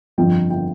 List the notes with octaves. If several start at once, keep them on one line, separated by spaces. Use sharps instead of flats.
G1 F2 D3 F3 G5
D3 F3 G5